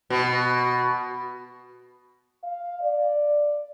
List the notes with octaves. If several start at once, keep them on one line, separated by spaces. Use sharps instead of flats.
B2
F5
D5